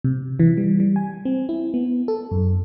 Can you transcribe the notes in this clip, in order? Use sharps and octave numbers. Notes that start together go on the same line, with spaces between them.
C3
E3
G3
G3
G#5
C4
E4
B3
A4
F#2